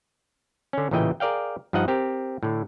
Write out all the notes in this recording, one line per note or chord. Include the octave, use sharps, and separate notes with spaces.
D3 C#4
A1 A#2 C#3 E3 D#5 G5
G#4 A#4 D5 F5 G5
G2 F3 D#4 D#5 F#5
C4 G4 A#4
A2 D3